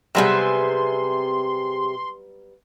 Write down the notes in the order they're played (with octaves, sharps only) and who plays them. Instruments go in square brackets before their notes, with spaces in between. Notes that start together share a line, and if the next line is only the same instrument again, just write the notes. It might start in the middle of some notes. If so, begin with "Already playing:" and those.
[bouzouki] C3 G#4 E5 [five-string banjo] F#3 G3 B3 [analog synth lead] C6